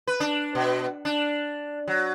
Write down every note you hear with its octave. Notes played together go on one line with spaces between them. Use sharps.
B4
D4
B2
D4
F#3